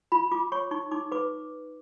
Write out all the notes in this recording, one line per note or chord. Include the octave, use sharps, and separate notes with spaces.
F4 B5
F4 D6
C#5 C#6
D#4 C#6
D#4 D6
B4 D6